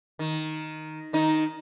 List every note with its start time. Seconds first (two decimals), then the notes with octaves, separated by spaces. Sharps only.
0.19 D#3
1.13 D#3 D#4